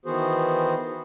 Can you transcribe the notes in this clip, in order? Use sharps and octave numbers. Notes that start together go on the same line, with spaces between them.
D#3 E3 B3 F#4 G#4 C5